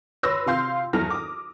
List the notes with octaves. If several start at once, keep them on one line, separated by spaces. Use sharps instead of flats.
B4 C#5 B5 C6 E6 A#6
C3 F4 F5 C6 G6
E2 F#3 E4 A4 F6 A#6
D6 D#6